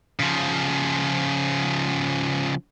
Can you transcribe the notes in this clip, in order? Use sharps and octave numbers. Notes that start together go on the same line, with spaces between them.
C#3 F3